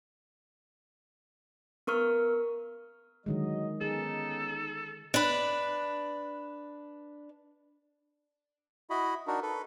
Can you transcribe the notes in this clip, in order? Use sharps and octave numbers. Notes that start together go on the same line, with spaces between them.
B3 A#4 C#6 F6
D3 D#3 F#3 G#3 D#5
B3 C#4 D#4 G#4 A4
D4 B4
E4 F#4 D#5 B5
D4 D#4 F#4 A#4
A4 B4